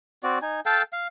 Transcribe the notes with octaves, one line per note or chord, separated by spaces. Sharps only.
C4 F#4 D5
D#4 G#5
A4 F5 G5 A5
F5